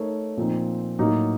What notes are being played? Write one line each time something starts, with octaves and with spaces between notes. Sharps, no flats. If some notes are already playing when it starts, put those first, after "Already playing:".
Already playing: A3 D#4 A#4 C#5
A#2 F3 C4 D#4
A2 F#3 A#3 D#4